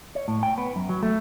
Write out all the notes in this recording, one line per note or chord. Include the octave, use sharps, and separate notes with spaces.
C#5
A2
G5
B3
F#2
F#3
A3